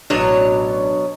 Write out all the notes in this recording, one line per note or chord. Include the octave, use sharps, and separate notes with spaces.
A1 B2 F#3 D4 C#5